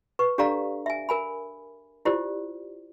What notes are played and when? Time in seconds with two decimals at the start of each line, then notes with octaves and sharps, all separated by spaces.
0.19 B4 C#6
0.38 D4 G4 A4 D5 F5 A#5
0.86 E5 G#5
1.09 A#4 G#5 B5
2.05 E4 F4 G4 C5 D5